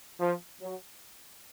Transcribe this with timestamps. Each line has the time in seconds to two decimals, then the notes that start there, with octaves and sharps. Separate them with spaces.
0.20 F3
0.61 F#3